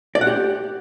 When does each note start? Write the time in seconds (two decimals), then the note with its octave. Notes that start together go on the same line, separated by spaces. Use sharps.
0.15 D5
0.21 F#5
0.27 G4